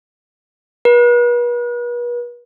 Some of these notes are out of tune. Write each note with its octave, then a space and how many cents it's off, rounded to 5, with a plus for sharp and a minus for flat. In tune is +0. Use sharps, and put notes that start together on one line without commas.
B4 -40